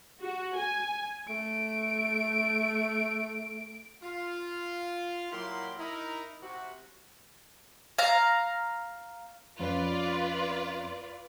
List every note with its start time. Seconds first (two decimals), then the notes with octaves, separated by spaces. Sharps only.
0.21 F#4
0.56 G#5
1.28 A3 D7
4.03 F4
5.32 A#2 F#3 A#3 E4 G4 C6
5.78 D#4 E4 A#4
6.42 C3 F#4
7.98 F5 A#5
9.59 F2 C4 C#4 F4 B4 D5